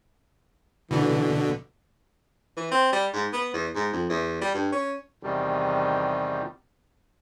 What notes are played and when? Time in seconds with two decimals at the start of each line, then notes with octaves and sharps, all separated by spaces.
0.91 B2 D3 E3
2.57 E3
2.71 C4
2.92 G3
3.14 G#2
3.33 B3
3.53 E2
3.75 G#2
3.93 F2
4.10 E2
4.41 G3
4.54 G2
4.72 C#4
5.23 E2 C3 D#3 G3